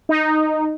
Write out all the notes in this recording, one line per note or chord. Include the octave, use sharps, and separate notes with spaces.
D#4